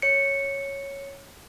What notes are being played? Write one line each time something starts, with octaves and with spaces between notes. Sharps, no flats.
C#5 C#7